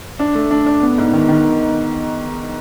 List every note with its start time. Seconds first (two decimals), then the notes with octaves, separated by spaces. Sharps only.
0.19 D4
0.35 A3
0.51 D4
0.66 D4
0.83 B3
0.98 G#2
1.13 D#3
1.29 D#3